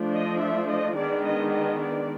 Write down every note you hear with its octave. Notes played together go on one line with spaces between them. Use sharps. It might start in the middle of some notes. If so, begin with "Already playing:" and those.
Already playing: F3 A3 D4
D#5
E5
D#5
D#3 G#3 B3 D4 D5
D#5
D#5
D5